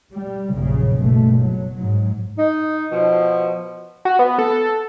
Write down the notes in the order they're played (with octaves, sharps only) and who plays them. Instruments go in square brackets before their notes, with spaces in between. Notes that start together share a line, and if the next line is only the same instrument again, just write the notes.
[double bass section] G3
A#1 F#2 C#3
F#1 G2 B2 A3
F#3
G#2 F#3
[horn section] D#4
B2 F3
[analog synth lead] F#4
B3
A4